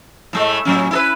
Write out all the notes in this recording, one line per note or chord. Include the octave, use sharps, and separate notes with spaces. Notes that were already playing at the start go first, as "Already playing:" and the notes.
A2 G#3 A3
A2 F#3 C#4
E4 A4 B4